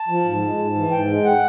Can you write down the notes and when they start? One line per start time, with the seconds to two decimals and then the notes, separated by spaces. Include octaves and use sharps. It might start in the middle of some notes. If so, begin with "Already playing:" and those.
Already playing: A5
0.08 F3
0.25 G#2
0.42 G#3
0.58 G#2
0.74 E3
0.91 G#2 G5
1.08 G#3
1.24 F#5